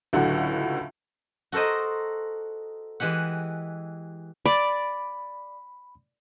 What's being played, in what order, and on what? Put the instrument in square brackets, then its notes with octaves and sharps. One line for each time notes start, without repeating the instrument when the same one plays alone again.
[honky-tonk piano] C#2 A2 D3 F#3 F#5
[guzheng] F#4 A4 A#4 C5 D#5
E3 G#3 G4 F#5
[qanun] D5 [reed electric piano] B5